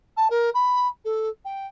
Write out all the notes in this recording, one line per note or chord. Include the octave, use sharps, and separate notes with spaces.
A5
A#4
B5
A4
G5